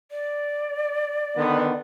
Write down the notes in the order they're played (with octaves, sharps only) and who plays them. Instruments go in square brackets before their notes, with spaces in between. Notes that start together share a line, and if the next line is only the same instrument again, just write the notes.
[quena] D5
[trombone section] D3 D#3 B3